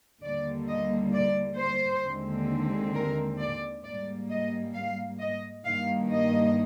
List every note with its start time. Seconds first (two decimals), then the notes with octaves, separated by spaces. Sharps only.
0.23 D#2 D3 G3 A#3 D5
0.69 D#5
1.13 D5
1.58 C5
2.04 D#2 D3 G#3 C4
2.94 A#4
3.39 D5
3.84 G#2 G3 A#3 D5
4.30 D#5
4.75 F5
5.20 D#5
5.65 G2 D#3 A#3 F5
6.11 D#5